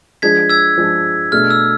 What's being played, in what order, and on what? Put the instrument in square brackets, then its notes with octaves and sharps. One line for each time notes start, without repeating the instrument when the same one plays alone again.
[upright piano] F3 G#3 D4 G#4 [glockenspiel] G#6 B6
[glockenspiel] E6 G#6
[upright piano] F3 G#3 D4 G#4
[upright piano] B2 A3 D4 G#4 [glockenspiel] F6
[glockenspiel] E6